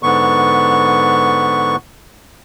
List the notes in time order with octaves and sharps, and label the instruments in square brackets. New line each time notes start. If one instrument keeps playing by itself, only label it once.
[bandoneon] G#2 D3 B3 C#6